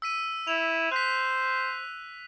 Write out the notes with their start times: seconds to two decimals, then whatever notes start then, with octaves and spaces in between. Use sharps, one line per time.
0.02 E6 B6 D#7
0.47 E4 F7
0.92 C5 F#6 B6